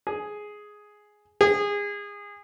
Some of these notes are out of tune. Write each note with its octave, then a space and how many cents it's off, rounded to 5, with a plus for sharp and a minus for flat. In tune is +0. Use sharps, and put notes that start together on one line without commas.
G#4 +5
G#4 -25